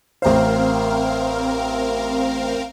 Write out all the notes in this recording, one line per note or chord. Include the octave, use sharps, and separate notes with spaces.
A1 C4 A#4 C5 F5